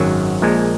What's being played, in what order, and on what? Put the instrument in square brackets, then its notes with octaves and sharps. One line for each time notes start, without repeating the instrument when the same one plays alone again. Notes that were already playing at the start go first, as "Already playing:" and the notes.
Already playing: [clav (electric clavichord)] G#1 F#2 D#3 F#3
A#1 A#2 G#3